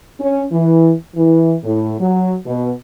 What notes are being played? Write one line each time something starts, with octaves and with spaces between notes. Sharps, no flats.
C#4
E3
E3
A2
F#3
B2